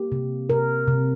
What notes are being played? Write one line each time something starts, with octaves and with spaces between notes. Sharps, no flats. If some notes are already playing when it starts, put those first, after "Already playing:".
Already playing: A#3 G4
C3
C3 A#4
C3